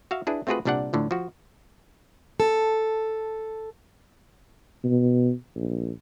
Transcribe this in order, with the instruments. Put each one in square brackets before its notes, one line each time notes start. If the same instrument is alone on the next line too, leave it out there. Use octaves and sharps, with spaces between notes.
[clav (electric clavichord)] F#4 E5 F5
D4 E4 G#4 B4
A3 C4 F4 F#4 G#4 B4
C2 A#2 G3 D4 D5 F#5
A2 D3 F3
F3 F#4
[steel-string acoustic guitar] A4
[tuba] B2
A#1